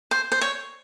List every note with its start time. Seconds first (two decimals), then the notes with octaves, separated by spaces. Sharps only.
0.11 C5
0.32 C5
0.41 C#5